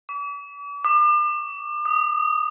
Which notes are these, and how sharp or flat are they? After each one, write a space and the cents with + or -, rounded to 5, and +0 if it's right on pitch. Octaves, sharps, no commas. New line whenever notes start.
D6 -45
D6 +40
D#6 -5